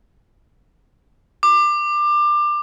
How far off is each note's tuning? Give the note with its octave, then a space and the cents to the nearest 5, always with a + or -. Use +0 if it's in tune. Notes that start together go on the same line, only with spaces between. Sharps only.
D6 +20